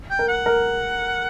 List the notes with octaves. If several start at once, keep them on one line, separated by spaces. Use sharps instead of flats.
G5
A#4
F#5
A#4